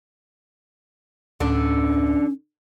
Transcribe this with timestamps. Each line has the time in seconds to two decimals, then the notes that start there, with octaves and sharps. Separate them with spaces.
1.40 D2 A2 D3 C#4 D4